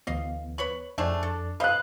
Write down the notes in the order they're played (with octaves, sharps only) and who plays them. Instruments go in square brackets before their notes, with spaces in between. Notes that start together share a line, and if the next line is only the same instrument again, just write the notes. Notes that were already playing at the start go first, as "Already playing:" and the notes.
[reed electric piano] D2 E3 B3 [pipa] D#5 F5
[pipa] B4 C#5 B5
[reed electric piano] F2 [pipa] A3 C4 G#4 [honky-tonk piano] D4
[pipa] A4
[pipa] C4 B4 D#5 [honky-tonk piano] F5 F#6 [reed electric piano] B5